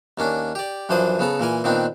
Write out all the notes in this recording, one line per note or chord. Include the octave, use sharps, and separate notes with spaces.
D#2 A#3 C#4 D4
G4 D5
F#2 E3 F3 D4 C5 D#6
C#3 B3 A4 A#5
A#2 E3 A#4 G#5
A#2 D#3 B3 C4 D4 D#4